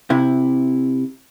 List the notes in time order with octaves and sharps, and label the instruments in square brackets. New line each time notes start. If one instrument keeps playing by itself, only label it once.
[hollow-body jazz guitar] C3 E4